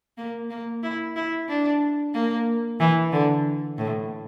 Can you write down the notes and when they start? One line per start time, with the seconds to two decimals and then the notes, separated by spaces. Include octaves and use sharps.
0.18 A#3
0.50 A#3
0.83 E4
1.16 E4
1.48 D4
2.14 A#3
2.80 E3
3.12 D3
3.78 A2